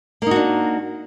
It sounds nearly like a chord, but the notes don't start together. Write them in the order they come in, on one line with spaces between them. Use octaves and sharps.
A#3 D#4 F#4 D4